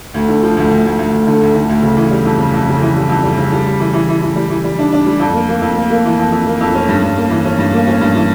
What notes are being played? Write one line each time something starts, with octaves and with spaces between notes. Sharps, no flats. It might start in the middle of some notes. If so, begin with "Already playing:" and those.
D2
D3
F3
D2
D2
D2
D2
D2
D3
D2
D3
D2
C#3
E3
G3
F2
C#3
F2
C#3
E3
G3
F2
G3
C#3
G3
G3
E3
E3
E3
E3
G3
E3
G3
D4
D4
G3
F2
A#3
A#3
F2
A#3
A#3
E3
F2
F2
A#3
F2
C#4
G2
G2
A#3
E3
C#4
G2
A#3
C#4
G2
E3